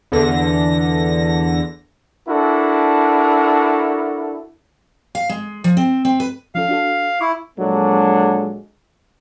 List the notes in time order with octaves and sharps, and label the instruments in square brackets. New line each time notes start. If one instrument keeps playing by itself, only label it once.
[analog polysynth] E2 D3 A#6
[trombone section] D4 E4 F#4 A4 A#4
[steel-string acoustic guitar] F5
G#3
F3
C4
C4
B4
[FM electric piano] F3 C#4 A4 [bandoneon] F5
[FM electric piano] D4 F#4 A4
[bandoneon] E4 [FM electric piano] C#6 D6
[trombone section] A#1 F#3 G#3 A#3 D4 A4